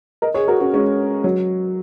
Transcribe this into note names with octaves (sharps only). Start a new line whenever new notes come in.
A#4 D#5
G#4 C#5
F#4 A#4
C#4 F#4
G#3 C#4
F#3